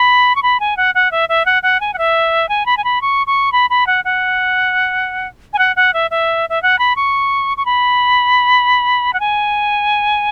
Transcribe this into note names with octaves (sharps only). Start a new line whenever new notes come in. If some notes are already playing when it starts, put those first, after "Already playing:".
Already playing: B5
C#6
B5
G#5
F#5
F#5
E5
E5
F#5
F#5
G#5
F#5
E5
G#5
B5
G#5
B5
C#6
C#6
B5
B5
F#5
F#5
G#5
F#5
F#5
E5
E5
E5
F#5
B5
C#6
C#6
B5
F#5
G#5